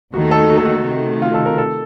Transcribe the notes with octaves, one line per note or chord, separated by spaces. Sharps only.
D#2 D#3 A3 D#4 F#4
A4
F#4
A4
F#4
C3 D#3 A3
F4
A4
A#4
A4